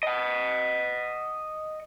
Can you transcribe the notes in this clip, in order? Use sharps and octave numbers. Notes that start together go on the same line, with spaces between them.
D#5 F#5